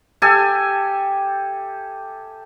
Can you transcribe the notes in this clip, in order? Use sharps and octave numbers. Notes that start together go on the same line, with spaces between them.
G4 A4 E5 G#5